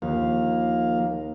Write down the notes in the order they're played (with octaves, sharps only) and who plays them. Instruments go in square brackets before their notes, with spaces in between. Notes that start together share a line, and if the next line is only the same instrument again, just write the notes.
[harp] D#2 [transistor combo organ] F3 A#3 F5